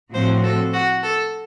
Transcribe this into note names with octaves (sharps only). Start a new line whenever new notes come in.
A2 F3 C4 F#4 C5
A4
F#4
A4